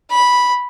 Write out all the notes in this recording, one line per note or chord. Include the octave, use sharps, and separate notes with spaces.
B5